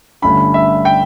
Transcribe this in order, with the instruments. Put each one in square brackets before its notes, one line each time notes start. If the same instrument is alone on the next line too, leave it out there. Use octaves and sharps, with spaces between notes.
[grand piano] G1 G2 D3 A3 C#4 B5
E5
G5